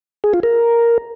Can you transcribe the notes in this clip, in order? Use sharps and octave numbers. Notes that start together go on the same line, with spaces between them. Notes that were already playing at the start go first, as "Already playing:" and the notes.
G#4
F4
A#4